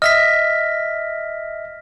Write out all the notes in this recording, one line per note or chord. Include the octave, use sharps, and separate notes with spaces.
D#5 E5 F6 A#6 B6